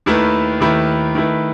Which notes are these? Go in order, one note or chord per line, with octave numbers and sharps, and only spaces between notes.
D#2 D#3 A3 E4 B4
D#2 D#3 A3 E4 B4
D#3 A3 E4 B4